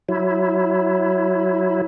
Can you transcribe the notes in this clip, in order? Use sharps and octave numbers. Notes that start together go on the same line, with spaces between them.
F#3 E4